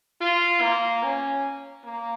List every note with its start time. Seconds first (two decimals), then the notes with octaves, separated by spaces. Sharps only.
0.21 F4
0.62 A#3
1.03 C#4
1.85 A#3